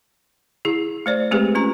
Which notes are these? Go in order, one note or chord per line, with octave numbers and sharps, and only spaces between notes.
E4 G#4
A3 C5 D5
G#3 A3 C4 G4 G#4 B4
C#4 F4 A#5